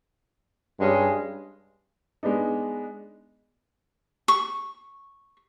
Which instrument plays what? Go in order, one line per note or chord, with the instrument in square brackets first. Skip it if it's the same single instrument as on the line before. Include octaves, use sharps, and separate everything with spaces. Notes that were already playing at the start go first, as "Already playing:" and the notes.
[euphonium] G2 [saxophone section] G#3 C#4
[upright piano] G#3 B3 D4 D#4
[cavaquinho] C#6